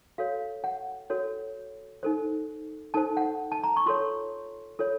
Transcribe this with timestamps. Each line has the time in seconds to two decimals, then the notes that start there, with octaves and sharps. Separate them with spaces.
0.18 F#4 A4 C#5 F5
0.64 F#5
1.10 F#4 A4 C#5
2.03 D#4 A4 C5
2.94 D#4 A4 C5 A5
3.17 F#5
3.52 A5
3.64 A#5
3.77 C#6
3.86 F4 A4 C#5 C6
4.79 F4 A4 C#5